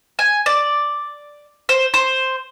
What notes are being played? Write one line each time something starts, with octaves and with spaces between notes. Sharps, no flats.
G#5
D5
C5
C5